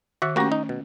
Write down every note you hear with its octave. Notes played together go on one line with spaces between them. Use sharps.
D#3 F#4 E5 F#5
A3 A#3 C#4 F#4 G4 C#6
D#4
B2